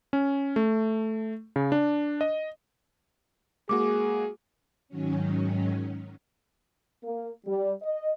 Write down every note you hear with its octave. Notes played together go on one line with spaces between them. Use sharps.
C#4
A3
C#3
D4
D#5
G#3 A#3 F#4 G#4 D6
G#2 D#3 F#3 C#4
A#3
G3
D#5